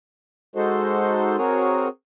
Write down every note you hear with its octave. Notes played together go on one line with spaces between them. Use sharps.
G#3 D#4 F#4 A4 C5
C4 F#4 G#4 A#4 C#5